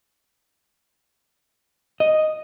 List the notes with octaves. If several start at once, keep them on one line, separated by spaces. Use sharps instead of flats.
D#5